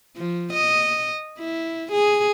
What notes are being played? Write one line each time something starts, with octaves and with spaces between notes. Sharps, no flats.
F3
D#5
E4
G#4